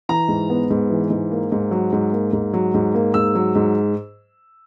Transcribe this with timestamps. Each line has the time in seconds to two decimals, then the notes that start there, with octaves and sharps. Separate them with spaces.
0.09 E3 A#5
0.28 G#2
0.50 B3
0.70 G#2
0.90 E3
1.10 G#2
1.31 A#3
1.52 G#2
1.71 F#3
1.92 G#2
2.13 A#3
2.33 G#2
2.53 F#3
2.74 G#2
2.94 A#3
3.14 G#2 E6
3.35 F#3
3.55 G#2